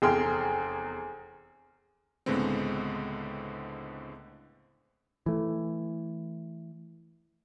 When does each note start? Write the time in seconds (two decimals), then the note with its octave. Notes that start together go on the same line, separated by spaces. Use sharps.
0.02 F1 E2 G#4 G5 C6 F6
2.26 C#2 A2 D3 G#3 B3 C4
5.26 E3 A3